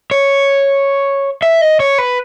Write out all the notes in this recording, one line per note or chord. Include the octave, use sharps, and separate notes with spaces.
C#5
E5
D#5
C#5
B4